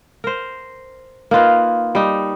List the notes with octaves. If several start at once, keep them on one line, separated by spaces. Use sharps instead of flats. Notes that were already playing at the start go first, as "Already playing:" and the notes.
A#4 C5
A#3 D#4 F4 B4
G3 D#4